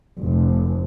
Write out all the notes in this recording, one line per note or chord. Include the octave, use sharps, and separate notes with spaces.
F1